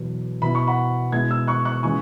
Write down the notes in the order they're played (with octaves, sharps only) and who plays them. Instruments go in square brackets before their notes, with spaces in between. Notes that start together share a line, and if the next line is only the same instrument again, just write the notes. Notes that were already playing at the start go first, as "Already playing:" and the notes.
Already playing: [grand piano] E2 B2 F#3
B2 B3 E4 B5
C#6
F#5 B5
B2 G#3 B3 E4 G#6
E6 G#6
C#6 F#6
C#6 F#6
C#3 E3 G#3 G#5 C#6